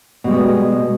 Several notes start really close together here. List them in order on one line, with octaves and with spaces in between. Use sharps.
B2 G3 G#3 B3